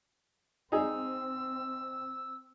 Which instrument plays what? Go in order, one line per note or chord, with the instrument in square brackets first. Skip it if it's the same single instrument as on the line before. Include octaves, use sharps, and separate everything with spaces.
[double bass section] C4 [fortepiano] D#4 G#4 [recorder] E6